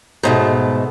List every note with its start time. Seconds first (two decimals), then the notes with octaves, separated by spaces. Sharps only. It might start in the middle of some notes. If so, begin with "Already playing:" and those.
0.23 G#2 B2 A3